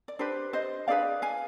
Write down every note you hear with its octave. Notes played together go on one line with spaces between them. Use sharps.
D5
D4 G4 B4 C5
C5 D#5
D4 G#4 B4 D5 F5
F5 G#5